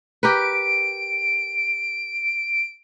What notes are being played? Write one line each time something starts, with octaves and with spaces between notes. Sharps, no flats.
G4 A#4 B4 D7